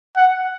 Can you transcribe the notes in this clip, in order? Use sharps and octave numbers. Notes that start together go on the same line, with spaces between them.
F#5